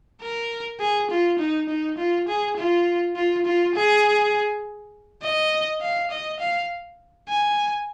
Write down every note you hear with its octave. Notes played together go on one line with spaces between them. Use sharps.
A#4
G#4
F4
D#4
D#4
F4
G#4
F4
F4
F4
G#4
D#5
F5
D#5
F5
G#5